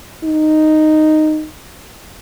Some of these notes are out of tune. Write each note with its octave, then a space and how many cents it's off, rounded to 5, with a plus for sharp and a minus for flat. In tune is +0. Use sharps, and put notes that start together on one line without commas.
D#4 -5